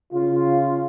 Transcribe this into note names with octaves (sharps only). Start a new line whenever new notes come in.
C#3 F4